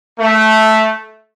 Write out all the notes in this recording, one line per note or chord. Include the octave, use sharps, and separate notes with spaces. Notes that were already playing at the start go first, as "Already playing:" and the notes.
A3